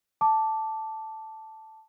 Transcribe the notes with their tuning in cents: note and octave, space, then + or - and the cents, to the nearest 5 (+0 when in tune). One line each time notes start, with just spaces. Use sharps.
A5 +0 D6 -5